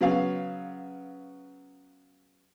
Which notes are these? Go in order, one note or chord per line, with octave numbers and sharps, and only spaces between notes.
C#3 F#3 B3 F5